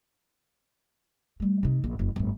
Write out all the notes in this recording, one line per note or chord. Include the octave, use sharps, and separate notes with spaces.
G3 A3
C3 D#4
A#1
F#1
G1 A2